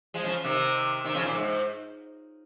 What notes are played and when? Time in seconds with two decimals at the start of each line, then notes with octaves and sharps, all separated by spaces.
0.14 F3 G#3
0.24 C#3 F3
0.44 C3 D#3
1.04 C3 D#3
1.15 C#3 F3
1.24 A#2
1.35 G#2